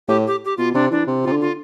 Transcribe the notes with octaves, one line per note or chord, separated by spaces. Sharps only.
A2 G4
G4
G4
B2 F4
C3 D4
E3 D4
C3
C3 F4
D3
F4